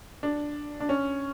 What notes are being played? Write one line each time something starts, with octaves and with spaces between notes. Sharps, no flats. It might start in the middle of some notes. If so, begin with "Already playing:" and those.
D4
D4
C#4